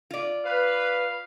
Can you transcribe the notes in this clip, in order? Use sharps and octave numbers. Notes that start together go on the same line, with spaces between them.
F4 D5
B4 F5